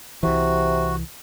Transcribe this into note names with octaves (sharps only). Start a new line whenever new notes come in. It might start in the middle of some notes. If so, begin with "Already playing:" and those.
C2 C3 E3 F#4